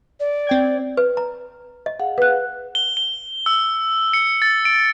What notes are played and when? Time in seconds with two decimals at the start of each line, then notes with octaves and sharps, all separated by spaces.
0.20 D5
0.47 C4 G5 G#6
0.97 B4
1.17 A#5
1.86 D#5
1.99 G#4 F5 F#5
2.18 B4 F#6
2.75 G7
2.97 G7
3.46 E6
4.14 C#7
4.42 A6
4.65 D7